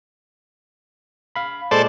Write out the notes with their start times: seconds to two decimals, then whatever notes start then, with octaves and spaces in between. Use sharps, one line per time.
1.36 F5 B5
1.71 A#2 G#3 A4 C5 D5